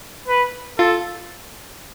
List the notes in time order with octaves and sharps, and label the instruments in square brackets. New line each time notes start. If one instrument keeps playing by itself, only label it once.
[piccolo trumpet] B4
[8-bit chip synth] F4 [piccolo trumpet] A4